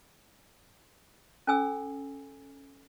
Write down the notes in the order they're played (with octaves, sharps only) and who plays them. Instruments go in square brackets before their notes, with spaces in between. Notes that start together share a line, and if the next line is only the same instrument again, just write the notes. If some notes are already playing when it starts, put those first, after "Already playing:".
[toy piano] C#4 A4 G#5 E6